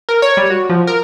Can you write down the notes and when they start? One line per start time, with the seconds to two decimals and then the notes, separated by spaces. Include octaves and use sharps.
0.09 A#4
0.22 C#5
0.37 G3
0.50 F#4
0.70 F3
0.87 A#4